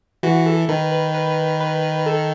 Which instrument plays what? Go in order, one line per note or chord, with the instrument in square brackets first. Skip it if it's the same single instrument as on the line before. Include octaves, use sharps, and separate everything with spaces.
[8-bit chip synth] E3 [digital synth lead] F#4
[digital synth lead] A4
[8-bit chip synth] D#3 [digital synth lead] B4
[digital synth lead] B4
B4
B4
A4